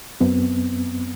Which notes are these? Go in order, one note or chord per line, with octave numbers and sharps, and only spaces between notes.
F#2 B3 C4